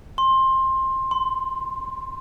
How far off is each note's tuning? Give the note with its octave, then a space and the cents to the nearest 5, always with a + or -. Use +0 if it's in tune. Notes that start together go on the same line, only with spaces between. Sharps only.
C6 +20
C6 -15